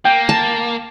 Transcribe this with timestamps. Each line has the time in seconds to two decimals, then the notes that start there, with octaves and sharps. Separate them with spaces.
0.05 A#3 G5
0.29 A5